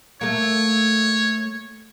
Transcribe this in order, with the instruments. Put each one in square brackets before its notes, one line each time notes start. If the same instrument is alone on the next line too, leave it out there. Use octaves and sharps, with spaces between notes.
[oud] A3 A#3 [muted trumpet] C#5